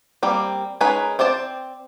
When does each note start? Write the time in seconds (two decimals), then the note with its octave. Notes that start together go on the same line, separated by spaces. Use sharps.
0.23 G3 A#3 C4
0.81 G#3 C#4 D#4 A#4 B4
1.19 C4 C5 D5 A5